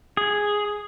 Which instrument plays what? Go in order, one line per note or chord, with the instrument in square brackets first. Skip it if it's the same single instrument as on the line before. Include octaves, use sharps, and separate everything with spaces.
[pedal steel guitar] G#4